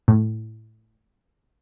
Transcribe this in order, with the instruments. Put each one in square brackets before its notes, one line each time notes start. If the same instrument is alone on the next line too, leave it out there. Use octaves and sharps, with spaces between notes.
[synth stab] A2